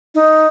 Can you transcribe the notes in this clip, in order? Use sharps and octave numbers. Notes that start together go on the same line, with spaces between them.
D#4